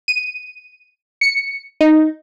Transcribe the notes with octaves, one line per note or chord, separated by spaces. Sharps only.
D#7
C#7
D#4